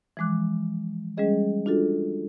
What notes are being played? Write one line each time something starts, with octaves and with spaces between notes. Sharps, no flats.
E3 F3 G#3 D6 F#6
G3 G#3 C#4 G#4 D#5
D4 F4 F#4 A4